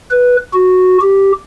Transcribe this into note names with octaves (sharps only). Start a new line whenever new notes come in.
B4
F#4
G4